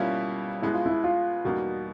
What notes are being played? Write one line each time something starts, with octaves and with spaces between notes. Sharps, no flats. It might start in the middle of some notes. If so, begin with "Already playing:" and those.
Already playing: B2 G3 A#3 C#4 E4 F4
B2 G#3 B3 E4
F4
E4
F4
E2 B2 G3 A#3 D#4 F#4